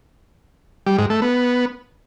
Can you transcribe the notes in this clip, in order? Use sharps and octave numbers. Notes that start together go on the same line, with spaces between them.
G3
G#2
A3
B3